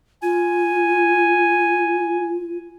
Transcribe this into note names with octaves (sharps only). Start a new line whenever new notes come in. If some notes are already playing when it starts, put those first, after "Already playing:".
F4 G#5